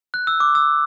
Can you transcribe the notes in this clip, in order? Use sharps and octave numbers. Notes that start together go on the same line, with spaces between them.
F#6
E6
D6
E6